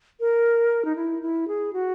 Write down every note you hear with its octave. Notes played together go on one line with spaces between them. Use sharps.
A#4
D#4
E4
E4
G#4
F#4